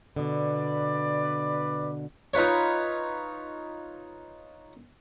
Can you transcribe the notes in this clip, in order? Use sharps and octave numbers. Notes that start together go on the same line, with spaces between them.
B2 D3 B4 D5
D#4 F4 B4 C#5